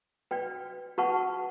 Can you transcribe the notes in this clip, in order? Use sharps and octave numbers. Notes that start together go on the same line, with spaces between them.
F#4 B4 D5 G5
F#4 B4 F#5 A5 C#6